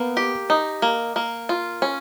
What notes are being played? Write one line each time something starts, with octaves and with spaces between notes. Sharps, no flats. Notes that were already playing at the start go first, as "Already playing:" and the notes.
Already playing: A#3 B3
G4
D#4
A#3
A#3
F4
C#4